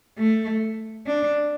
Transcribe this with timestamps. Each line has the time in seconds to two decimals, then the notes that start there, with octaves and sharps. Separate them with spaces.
0.18 A3
1.07 D4